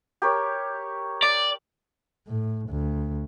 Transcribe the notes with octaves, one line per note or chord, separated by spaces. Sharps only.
G4 A#4 C#5
D5 D6
A2
D2